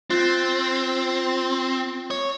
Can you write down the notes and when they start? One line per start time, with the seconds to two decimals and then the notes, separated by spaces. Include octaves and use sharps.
0.10 C4 F4 F#6 A6
2.11 C#5